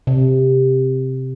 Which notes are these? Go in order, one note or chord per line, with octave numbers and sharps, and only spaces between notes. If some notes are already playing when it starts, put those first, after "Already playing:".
C3